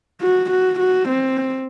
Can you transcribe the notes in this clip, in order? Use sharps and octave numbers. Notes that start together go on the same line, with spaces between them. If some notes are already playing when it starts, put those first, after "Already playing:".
F#4
F#4
F#4
C4